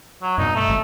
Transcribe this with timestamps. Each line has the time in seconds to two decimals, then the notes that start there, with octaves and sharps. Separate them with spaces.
0.23 F#3
0.38 G2 B2 D#4
0.56 A3
0.68 G#1 G#3